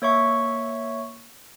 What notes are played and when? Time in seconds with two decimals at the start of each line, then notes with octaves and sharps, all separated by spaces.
0.02 A#3 C#5 E5 C#6